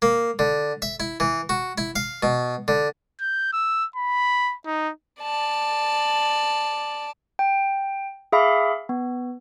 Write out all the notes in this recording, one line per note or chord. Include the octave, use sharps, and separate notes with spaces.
A#3
D3
E5
E4
E3
F#4
E4
F5
B2
D3
G6
E6
B5
D#4
D5 A5
G5
G#4 E5 F5 B5 D6
B3